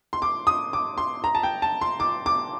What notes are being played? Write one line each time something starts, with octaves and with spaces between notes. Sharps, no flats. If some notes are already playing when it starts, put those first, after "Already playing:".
C6
D6
D#6
D6
C6
A#5
A5
G5
A5
C6
D6
D6